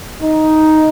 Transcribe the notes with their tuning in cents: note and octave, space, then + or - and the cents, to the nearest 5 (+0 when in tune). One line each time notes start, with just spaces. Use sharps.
D#4 +5